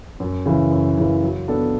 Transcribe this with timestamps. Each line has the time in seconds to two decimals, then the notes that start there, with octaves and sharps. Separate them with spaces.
0.20 F#2
0.46 C#3 E3
0.71 F#2
0.98 C#3 E3
1.23 F#3
1.48 B3 D4 A4